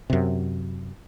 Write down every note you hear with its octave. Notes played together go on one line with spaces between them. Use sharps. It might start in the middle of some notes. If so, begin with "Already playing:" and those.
F#2 C3